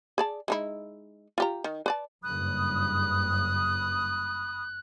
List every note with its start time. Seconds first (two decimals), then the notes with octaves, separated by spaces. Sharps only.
0.18 G#4 D5 A5
0.48 G#3 D#4 E4
1.38 F4 G4 A#5
1.64 D#3
1.86 B4 D5 A5
2.24 F#1 G2 B5 D#6 F#6